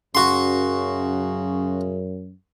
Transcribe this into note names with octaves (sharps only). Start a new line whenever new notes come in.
F#2 C#3 F#4 C6